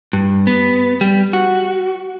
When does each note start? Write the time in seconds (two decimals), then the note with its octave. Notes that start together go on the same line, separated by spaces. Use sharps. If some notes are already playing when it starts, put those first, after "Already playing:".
0.13 G2
0.47 B3
1.01 G3
1.33 F#4